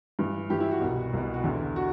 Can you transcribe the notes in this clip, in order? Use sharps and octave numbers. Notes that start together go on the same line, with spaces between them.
G2 E3
G2 E3 G4
E4
F#4
C2 B2
C2 B2
F#4
E2 D3 E4
F#4